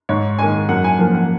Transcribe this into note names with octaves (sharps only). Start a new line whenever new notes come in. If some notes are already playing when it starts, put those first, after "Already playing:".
G#2 C#5
D#3 G#3 G#5
F#2 F#5
G#5
F3 A#3 G#5
F#5